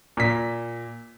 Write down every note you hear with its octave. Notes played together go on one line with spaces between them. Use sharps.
A#2 B6